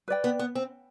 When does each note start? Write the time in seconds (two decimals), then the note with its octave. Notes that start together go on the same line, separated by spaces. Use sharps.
0.08 B4 D5 G5
0.24 B3
0.39 B3
0.55 C4